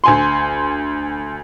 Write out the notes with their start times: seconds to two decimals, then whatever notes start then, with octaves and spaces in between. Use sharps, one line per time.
0.04 D2 G#5 C6